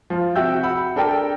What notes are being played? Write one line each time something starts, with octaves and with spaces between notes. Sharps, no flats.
F3 F4
C3 F#4 E5 G5 E6 G6
F#5 B5 E6
D4 A4 A#4 G5